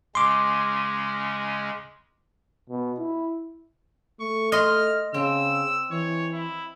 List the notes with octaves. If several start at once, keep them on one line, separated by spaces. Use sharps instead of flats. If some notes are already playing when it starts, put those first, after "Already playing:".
C#3 G#3 C#4 C6 D6
B2
E4
A3 C#6
D#5 C6 F6
C#3 C4 E6
E3 C#5
E4